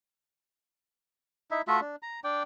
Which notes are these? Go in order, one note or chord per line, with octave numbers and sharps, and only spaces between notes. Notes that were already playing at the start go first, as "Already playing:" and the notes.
D#4 E4 E5
A3 F4 F#4 E5
D4
A#5
D4 D5 G5